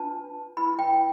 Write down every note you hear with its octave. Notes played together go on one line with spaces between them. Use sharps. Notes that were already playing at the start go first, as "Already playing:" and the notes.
Already playing: D4 F4 B4 A5
E4 B4 B5
G5